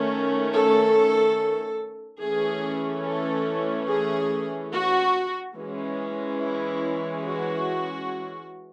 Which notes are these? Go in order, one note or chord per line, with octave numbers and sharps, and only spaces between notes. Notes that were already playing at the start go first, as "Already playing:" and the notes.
Already playing: D#3 A3 C#4
A4
E3 A3 C#4 G#4
A4
G#4
F#4
E3 G#3 C#4
E4
F#4